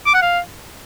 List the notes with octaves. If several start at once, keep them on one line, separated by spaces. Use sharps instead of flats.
D6
F#5
F5